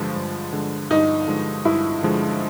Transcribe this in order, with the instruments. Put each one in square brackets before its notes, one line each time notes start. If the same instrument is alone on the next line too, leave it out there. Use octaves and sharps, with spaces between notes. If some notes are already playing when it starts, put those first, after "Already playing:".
Already playing: [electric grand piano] G2 D3 F3 G#3
G2
D3 F3 G#3
[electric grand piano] G2 [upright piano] D#4
[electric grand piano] D3 F3 G#3
[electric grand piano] G2 [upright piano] E4
[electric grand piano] D3 F3 G#3